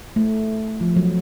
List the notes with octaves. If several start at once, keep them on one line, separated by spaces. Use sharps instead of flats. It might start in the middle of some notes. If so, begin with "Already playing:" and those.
A3
F3
F#3